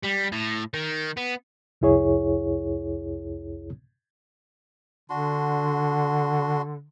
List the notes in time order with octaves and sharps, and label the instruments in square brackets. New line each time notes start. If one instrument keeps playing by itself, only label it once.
[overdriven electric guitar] G3
A2
D#3
B3
[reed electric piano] C2 F2 E4 G#4 C#5
[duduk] D3 [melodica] D4 F#4 C6